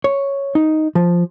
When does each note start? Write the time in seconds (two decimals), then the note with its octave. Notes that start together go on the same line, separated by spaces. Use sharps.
0.04 C#5
0.55 D#4
0.95 F3